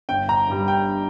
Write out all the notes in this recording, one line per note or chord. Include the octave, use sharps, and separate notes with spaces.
G1 G5
A#5
G2 G3
G5